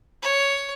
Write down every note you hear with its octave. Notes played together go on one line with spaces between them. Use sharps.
C#5